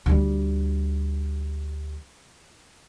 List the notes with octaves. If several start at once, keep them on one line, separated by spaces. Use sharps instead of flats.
D2 G3